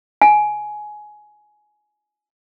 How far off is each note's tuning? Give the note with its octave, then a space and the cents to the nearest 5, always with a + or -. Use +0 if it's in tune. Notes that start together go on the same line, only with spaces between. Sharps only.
G#5 +15